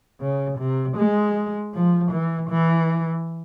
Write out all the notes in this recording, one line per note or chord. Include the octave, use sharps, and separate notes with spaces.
C#3
C3
G#3
F3
E3
E3